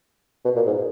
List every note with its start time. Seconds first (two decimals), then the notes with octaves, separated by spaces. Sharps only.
0.45 B2
0.56 A#2
0.66 G#2